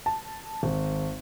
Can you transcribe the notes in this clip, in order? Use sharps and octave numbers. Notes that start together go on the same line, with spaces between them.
A5
G#1